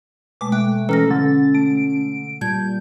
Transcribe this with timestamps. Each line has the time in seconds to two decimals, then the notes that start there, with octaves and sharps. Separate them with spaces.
0.41 B2 G#3 A3 D6
0.52 A3 G5 F#6
0.89 E3 C#4 A4 A#5 F6 A#6
1.11 D3 A6
1.55 A3 D7
2.41 A#2 G3 A5 G6 G#6